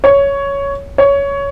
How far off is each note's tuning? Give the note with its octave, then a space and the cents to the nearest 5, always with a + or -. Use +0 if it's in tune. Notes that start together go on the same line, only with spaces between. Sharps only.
C#5 +10
C#5 +15